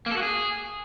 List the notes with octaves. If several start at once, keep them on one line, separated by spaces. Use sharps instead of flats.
A#3
A4
F#4
G#4